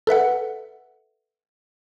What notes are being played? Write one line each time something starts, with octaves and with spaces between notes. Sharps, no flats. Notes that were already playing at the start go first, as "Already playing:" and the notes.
A4 B4 E5 F#5